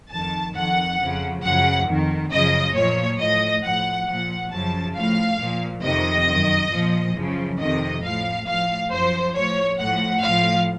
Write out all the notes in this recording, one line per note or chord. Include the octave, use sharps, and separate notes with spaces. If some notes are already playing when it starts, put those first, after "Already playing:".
F2 A5
D#3
F2 D#3 F#5
F2 C#3 F3
F#2 C#3 F3 F#5
F2 D#3
F#2 C#3 F3 D#5
A#2 F3 C#5
A2 F3 D#5
A2 F3 F#5
A#2 F3 F#5
F#2 C#3 F3 A5
A2 F3 F5
A#2 F3
F2 C3 D#3 D#5
F#2 D#3
A#2 F3
F#2 C#3 F3
F2 C3 D#3 D#5
A2 F3 F5
A2 F3 F5
F#2 F3 C5
A2 F3 C#5
A2 F3 F#5
A2 F3 F5